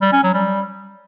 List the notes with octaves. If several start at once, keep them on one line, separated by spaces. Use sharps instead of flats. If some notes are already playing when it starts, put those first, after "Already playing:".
G3
C#4
F#3
G3